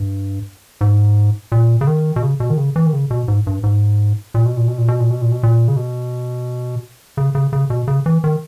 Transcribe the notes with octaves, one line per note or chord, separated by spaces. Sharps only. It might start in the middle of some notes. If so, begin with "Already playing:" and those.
Already playing: G2
G#2
A#2
C#3
D#3
B2
C#3
B2
D#3
C#3
E3
D#3
C#3
B2
G#2
G2
G#2
A#2
B2
A#2
B2
A#2
B2
A#2
B2
A#2
B2
A#2
C#3
B2
C#3
C#3
C#3
B2
C#3
E3
D#3